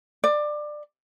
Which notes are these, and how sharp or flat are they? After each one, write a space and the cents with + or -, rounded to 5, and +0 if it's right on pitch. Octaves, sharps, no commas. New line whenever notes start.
D5 +20